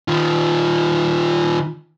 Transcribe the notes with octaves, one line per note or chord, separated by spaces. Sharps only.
D#3 F4